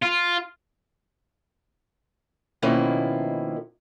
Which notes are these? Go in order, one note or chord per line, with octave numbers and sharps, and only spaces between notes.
F4
B2 D#3 F3 A#3 C#4 E4